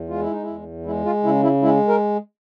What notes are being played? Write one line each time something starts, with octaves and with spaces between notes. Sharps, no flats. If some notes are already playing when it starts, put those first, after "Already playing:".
Already playing: E2
G#3 F4
E4
D#4
E2 E4
G#3 E4
F4
C#3 E4
E4
G#3 E4
A#4